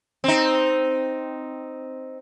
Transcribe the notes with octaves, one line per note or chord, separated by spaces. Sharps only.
C4 D#4